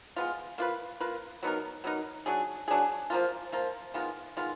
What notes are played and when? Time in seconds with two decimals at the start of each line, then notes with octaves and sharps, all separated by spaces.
0.16 G#3 B3 F4
0.58 A#3 F4 B4
1.01 A#3 F4 B4
1.43 F#3 B3 D#4 A#4
1.84 F#3 B3 D#4 A#4
2.26 F#3 D4 G#4
2.68 F#3 D4 G#4
3.10 F3 A#3 F4
3.52 F3 A#3 F4
3.94 D#3 G#3 B3 F4
4.37 D#3 G#3 B3 F4